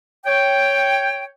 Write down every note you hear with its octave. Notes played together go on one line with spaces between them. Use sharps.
C#5 G5